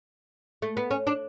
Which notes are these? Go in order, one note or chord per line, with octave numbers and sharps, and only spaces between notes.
A3
B3
C#4
D4